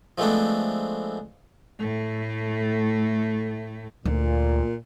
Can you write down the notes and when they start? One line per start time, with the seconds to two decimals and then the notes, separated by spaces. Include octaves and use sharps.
0.18 F3 G#3 A3 B3 C4 D4
1.80 A2 A3
4.05 D2 A#2 D3